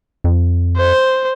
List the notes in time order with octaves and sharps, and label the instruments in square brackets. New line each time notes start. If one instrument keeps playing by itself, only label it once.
[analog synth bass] F2
[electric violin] C5